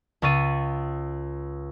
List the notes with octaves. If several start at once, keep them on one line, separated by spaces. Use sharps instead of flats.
C#2 C#4 C#5 A6 D#7